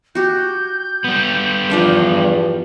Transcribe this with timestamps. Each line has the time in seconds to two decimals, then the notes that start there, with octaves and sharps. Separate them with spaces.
0.15 F#4 G4 G6
1.04 G3 B3
1.70 E2 G2 F3 D4 C#5